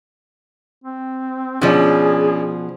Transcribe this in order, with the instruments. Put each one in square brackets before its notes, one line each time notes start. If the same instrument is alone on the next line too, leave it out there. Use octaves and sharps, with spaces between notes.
[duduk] C4
[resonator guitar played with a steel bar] B2 F3 [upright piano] C#4 D4 [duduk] G#4